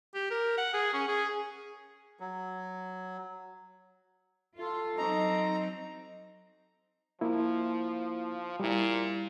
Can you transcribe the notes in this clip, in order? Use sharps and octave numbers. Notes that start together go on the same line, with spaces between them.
G4
A#4
F#5
G#4
C#4
G#4
F#3
F4 A4
F#3 C4 D#4 D#5 A#5 C#6
F3 A#3 E4
A#2 G3 E4